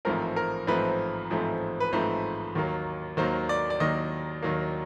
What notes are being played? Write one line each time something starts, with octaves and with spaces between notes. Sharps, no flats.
A1 G#2 F3 A3 C4 A#4
A#4
A1 G#2 F3 A3 C4 B4
A1 G#2 F3 A3 C4
B4
A1 G#2 F3 A3 C4 C5
D#2 D#3 F#3 A#3
D#2 D#3 F#3 A#3 C5
D5
D5
D#2 D#3 F#3 A#3 D#5
D#2 D#3 F#3 A#3